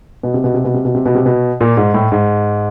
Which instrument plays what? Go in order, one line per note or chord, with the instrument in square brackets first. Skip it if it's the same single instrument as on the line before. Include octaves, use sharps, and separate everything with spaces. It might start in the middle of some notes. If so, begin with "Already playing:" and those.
[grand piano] B2
C3
B2
C3
B2
C3
B2
C3
B2
C3
B2
A#2
G#2
A2
G#2